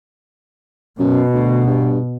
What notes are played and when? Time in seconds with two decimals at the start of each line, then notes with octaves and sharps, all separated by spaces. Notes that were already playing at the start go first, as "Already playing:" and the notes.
0.99 F#2 B2
1.34 D2
1.67 G2